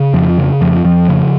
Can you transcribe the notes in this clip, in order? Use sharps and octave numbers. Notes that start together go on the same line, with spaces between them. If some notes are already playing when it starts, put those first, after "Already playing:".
Already playing: C#3
F2 F3
C#3
F2 F3
F2 F3
C#3